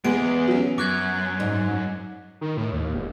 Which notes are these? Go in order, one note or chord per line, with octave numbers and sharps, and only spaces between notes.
E2 G#3 B3 D7
F#3 C#4
F#2 C#6 D6 F#6 G#6
G#2
D#3
A2
D#2
E1